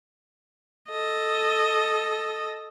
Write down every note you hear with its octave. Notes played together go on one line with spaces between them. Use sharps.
A4 D#5